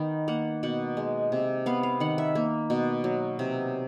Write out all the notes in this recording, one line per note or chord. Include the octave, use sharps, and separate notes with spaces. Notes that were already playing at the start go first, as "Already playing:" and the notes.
Already playing: D#3 B3 G5
A#3 F#5
B2 F#5
G#3
C3
B3 F5
F5
D#3 F#5
E5
A#3
B2
F#3
C3